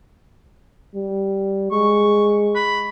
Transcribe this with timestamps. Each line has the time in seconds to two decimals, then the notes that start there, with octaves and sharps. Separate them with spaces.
0.95 G3
1.72 G#3 C#6
2.56 B5